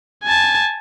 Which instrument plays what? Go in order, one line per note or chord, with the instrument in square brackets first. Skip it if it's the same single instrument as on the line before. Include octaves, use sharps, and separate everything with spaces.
[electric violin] G#5 A5